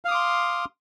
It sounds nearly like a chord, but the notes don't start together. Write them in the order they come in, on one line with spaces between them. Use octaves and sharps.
F5 D#6 D6 C6